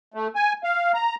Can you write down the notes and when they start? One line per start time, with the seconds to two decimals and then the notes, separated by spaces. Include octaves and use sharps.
0.14 A3
0.36 G#5
0.64 F5
0.94 A#5